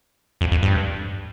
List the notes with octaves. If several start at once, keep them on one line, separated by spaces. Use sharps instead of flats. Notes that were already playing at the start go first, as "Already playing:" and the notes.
F2
F2
G2